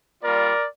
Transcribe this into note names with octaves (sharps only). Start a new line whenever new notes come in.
G3 A#3 F4 A#4 D5